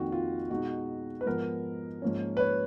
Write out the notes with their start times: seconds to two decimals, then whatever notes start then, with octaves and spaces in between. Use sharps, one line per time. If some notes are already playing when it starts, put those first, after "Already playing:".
Already playing: F2 D#3 A#3 D#4 F#4
0.12 F4
0.50 B2 G#3 D#4 F#4
1.21 B4
1.26 G#2 F3 B3 A#4
2.02 G#2 F3 A#3 C#4
2.37 B4
2.40 C#5